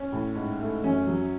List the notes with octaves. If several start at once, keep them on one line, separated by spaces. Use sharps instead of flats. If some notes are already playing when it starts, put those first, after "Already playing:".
Already playing: C#4
A2
G#2
A3
F#2 C#4
F#3